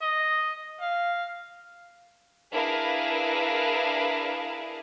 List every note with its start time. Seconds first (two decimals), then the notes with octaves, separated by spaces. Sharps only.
0.02 D#5
0.81 F5
2.51 D4 E4 G#4 A#4 B4 F5